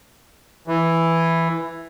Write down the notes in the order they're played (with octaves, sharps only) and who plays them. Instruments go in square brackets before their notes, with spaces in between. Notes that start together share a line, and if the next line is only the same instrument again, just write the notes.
[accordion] E3